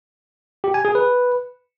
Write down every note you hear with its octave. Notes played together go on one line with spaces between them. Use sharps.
G4
G#5
G#4
B4